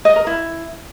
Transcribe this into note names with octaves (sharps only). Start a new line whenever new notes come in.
D#5
A#4
E4